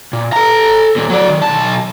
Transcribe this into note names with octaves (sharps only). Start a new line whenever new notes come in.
A#2
A4 A#5
D#2 A#2
F#3 D5
D#3
B1 A5